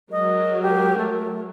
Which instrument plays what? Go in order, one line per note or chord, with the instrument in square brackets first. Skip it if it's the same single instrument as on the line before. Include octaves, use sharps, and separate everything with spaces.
[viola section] F#3 G#3 A#4 [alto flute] D#5
[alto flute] G4
A3